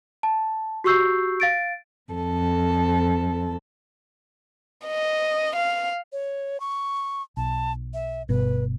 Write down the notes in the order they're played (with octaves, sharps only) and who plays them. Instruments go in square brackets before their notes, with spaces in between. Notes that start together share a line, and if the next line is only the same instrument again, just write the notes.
[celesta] A5
F#4 G4 C#6 E6 G6 C7
F5 A6 D7
[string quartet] F2 A4
[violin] D#5
F5
[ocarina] C#5
C#6
[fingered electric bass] B1 [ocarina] A5
[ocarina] E5
[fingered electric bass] G1 B2 [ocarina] B4